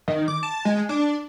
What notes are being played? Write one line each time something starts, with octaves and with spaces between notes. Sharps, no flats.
D#3
D6
A5
G#3
D4